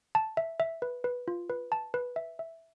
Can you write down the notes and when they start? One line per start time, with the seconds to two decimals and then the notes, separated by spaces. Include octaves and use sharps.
0.15 A5
0.37 E5
0.60 E5
0.82 B4
1.04 B4
1.28 F4
1.50 B4
1.72 A5
1.94 B4
2.16 E5
2.39 E5